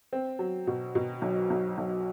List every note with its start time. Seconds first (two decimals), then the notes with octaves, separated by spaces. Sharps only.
0.13 C4
0.39 F#3
0.67 B2
0.95 B2
1.22 B1
1.50 B1
1.78 B1